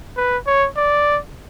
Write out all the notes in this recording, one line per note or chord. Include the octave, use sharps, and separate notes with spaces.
B4
C#5
D5